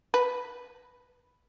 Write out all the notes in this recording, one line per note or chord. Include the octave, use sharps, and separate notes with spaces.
B4